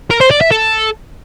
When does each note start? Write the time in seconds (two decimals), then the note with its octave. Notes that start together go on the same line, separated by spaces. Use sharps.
0.11 A#4
0.21 C5
0.31 D5
0.41 E5
0.51 A4